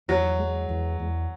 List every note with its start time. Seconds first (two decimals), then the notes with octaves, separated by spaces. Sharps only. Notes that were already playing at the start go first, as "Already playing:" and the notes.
0.08 E2 F#3
0.39 G#3
0.69 E2
0.99 E2